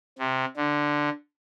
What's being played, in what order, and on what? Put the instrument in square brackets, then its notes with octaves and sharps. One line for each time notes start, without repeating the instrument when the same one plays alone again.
[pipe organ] C3
D3